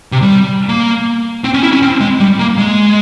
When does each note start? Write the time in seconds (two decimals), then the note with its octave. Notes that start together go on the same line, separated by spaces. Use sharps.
0.12 C3
0.22 G3
0.69 A#3
1.44 C4
1.54 C#4
1.63 E4
1.72 C#4
1.82 C4
2.00 G#3
2.20 G3
2.39 A#3
2.58 G#3